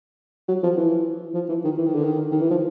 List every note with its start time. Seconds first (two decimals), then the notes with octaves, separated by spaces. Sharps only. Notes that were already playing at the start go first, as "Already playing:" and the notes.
0.48 F#3
0.63 F3
0.77 E3
1.34 F3
1.49 E3
1.64 D#3
1.78 E3
1.87 D#3
1.95 D3
2.04 D#3
2.32 D#3
2.40 E3
2.51 F3